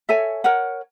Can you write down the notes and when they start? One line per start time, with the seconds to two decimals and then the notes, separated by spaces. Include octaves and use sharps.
0.09 A4 C#5 E5 G#5
0.44 A#4 C#5 F#5